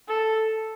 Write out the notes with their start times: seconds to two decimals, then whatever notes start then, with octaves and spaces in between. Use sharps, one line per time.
0.08 A4